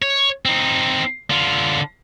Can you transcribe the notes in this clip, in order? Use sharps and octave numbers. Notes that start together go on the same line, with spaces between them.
C#5
C4 D#4
D3 F4